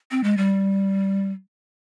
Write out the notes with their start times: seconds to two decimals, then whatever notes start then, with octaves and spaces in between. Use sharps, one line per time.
0.11 C4
0.24 G#3
0.37 G3